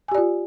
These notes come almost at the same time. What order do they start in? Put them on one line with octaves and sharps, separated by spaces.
G#5 G4 D5 F4